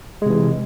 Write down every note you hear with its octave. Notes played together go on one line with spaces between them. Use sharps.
C3 E3 G#3